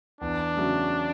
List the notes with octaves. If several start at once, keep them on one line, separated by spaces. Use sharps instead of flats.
E2 D4
C#3 F#3 A3